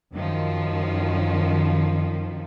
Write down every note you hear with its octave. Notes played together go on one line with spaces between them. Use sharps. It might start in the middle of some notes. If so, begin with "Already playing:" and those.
F#2 D#3 F3